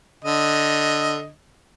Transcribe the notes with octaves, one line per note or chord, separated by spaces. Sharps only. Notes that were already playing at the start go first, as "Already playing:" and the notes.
D3 D#5